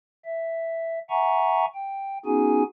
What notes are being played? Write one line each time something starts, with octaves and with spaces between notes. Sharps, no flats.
E5
E5 F#5 G#5 A#5 C#6
G5
B3 C#4 D#4 F#4 G#4 G#5